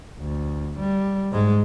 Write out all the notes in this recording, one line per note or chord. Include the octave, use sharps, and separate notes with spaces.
D2
G3
G#2 G#3